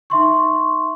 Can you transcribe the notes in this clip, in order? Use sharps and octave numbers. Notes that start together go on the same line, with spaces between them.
D#4 E5 C6 C#6